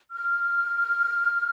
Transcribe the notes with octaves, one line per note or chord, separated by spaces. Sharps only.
F6